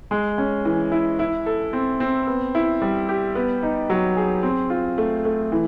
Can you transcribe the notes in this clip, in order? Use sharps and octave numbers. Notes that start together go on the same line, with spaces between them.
G#3
C#4
E3
E4
E4
A4
C4
C4
B3
E4
G3
G4
B3
D#4
F#3
G#4
C4
F4
A3
A3
E3